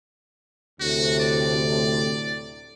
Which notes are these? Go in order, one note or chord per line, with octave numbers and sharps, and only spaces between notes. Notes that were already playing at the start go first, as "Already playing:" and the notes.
D2 A2 C3 F#4
D5